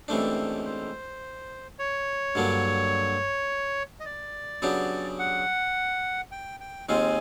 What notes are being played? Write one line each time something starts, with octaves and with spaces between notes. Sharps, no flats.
C#2 C3 E3 A3 D4 C5
C5
C#5
G2 D3 F#3 A#3 D4
D#5
D5
C#3 F#3 B3 D4 G4
F#5
G5
G5
D#2 D#3 G#3 C4 F4 G#5